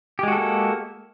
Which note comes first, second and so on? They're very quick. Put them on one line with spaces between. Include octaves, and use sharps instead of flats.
G4 G#3 F#4 A4 A#3